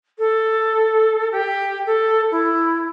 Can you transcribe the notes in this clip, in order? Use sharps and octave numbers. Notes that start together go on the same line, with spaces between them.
A4
G4
A4
E4